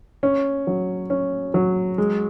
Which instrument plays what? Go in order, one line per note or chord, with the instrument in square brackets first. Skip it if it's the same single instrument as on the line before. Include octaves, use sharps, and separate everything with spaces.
[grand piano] C#4
F#3
C#4
F#3
G#3